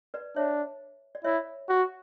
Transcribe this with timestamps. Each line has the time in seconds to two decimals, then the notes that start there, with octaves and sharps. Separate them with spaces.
0.14 B4 D5
0.36 D4 C#5 E5
1.15 D5
1.24 E4 C#5 E5
1.69 F#4